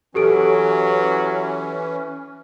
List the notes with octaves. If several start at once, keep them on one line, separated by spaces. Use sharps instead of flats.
E3 F#3 C#4 G4 A4 D7